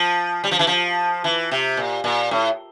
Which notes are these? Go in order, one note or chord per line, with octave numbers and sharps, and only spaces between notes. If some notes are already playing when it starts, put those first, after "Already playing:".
Already playing: F3
G3
F3
E3
F3
E3
C3
A#2
A#2
A2